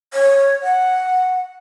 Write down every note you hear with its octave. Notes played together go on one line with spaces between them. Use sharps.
C#5
F#5